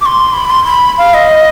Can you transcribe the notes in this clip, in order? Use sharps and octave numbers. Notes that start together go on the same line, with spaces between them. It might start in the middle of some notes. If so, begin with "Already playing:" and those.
D6
C6
B5
C6
B5
F5
D#5